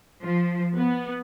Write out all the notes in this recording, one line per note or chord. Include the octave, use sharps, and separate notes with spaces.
F3
B3